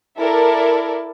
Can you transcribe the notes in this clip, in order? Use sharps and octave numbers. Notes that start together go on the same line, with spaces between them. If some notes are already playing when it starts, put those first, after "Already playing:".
E4 A4 A#4 D5